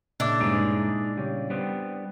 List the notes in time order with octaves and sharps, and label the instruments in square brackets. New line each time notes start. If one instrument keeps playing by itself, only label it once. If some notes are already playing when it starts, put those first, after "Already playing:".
[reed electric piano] A#2 D6 [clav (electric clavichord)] C#3 [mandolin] D4 E4
[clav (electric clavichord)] C#2 G2 C#3 [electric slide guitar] G#3 D#4 D5
[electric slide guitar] C#3 [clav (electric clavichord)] G3 C#5
[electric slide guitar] G3 B3 [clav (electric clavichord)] C4